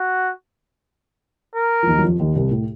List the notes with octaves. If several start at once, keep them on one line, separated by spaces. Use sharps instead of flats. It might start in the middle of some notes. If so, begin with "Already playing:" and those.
Already playing: F#4
A#4
F3
D#2 D#3
F#3
F2 F3
D#2 D#3
C2 C3
A2